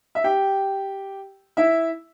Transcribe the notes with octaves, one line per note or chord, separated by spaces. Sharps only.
E5
G4 G5
E4 E5